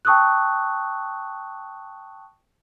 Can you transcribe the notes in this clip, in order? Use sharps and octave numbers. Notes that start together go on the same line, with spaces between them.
G5 A5 C#6 D#6 E6 F#6